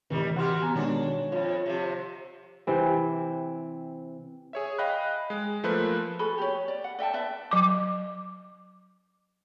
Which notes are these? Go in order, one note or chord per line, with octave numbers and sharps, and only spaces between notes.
D2 A2 C3 D#3 E3 G3
C3 F#4 G4 F#5 C6 F6
B3 G#5 A#5
B2 D#3 G#3 D4 F#4 C#5
F2 F4 C#5
C3 F3
C3 E3 C4
G#4 C#5 E5
D#5 F5 G5 B5 F#6
G#3
F3 A3 A#3 B4 C5 F#6
F#4 G#4 A4 B5
G4 C#5
D5
F#5
D5 E5 G5 A5
B4 D5 E5
F#3 D6